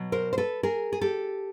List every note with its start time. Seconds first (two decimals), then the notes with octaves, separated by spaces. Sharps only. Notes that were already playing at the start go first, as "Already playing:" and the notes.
Already playing: B2 F#3
0.12 A#4 C5
0.33 C5
0.38 A4 B4
0.63 G#4 A#4
0.93 G#4
1.01 G4 A4